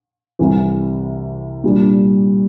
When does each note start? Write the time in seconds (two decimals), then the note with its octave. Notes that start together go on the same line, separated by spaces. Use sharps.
0.39 C2 C3 E3
1.64 A#2 G3 D4